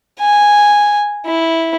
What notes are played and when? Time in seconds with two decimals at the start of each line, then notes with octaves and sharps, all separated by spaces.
0.20 G#5
1.26 E4